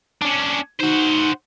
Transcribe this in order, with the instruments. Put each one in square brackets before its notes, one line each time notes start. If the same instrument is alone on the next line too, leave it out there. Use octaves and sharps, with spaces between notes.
[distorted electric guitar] C#4 D4
[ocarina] D#4 [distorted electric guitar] F#4 C5